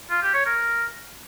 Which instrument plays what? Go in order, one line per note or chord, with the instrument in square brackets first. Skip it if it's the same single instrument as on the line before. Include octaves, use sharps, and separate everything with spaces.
[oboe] F4
G4
C#5
A#4